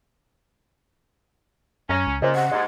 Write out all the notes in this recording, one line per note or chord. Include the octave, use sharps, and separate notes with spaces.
F#2 C#4 A#5 A#6
C#2
A#2 C#3 C5 D#5
C3 F#5
D#2 G#2 D#5